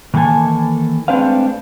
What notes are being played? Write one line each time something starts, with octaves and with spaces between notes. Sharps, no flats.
D#3 E3 A#3 A4 G#5 A5
G#3 A3 C4 D4 B4 F5